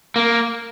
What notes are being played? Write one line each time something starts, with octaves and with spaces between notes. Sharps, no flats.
A#3